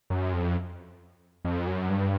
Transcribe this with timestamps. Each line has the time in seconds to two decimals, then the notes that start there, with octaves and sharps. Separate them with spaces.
0.10 F#2
0.33 F2
1.45 F2
1.67 F#2
1.90 G2